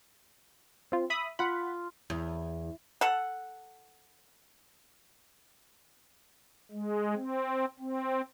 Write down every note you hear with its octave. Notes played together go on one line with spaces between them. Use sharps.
C4 F4
E5 B5 D#6
F4 F#5 B5
E2
A4 F#5
G#3
C4
C4